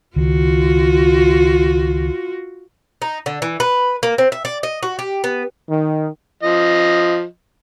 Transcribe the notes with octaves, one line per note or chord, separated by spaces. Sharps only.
C#2 D#3 F4 F#4
D#4
D3
E3
B4
A#3
C4
E5
D5
D#5
F#4
G4
B3
D#3
F3 D#5